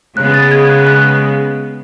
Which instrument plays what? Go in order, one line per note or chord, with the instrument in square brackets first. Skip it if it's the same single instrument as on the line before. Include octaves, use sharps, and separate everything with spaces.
[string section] C#3 G#3 B3 [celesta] F#6
[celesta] A6
G#6
F#6
F#6